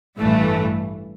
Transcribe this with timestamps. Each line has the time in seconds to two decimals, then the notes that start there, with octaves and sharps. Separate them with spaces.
0.18 A1 G2 E3 A3